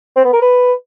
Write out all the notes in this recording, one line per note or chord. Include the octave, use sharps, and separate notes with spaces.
C4
B3
A#4
B4